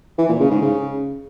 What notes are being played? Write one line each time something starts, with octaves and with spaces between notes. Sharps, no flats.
E3
A#2
C#3
G#2
C#3